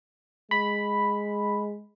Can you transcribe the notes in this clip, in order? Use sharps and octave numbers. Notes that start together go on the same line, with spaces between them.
G#3 B5